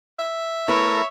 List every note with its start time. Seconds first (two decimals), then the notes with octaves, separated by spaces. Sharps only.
0.19 E5
0.68 A3 E4 A#4 B4 C#5